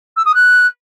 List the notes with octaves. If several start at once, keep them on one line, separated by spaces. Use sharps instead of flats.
E6
D#6
F#6